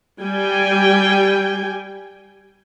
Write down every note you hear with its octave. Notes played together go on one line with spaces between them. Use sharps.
G3 G5 G#5